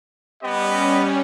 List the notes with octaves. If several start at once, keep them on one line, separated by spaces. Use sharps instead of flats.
G3 B3 C#4 G4 D#5